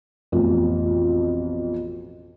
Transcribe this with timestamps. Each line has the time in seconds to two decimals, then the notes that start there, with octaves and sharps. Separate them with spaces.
0.32 A1 F2 B2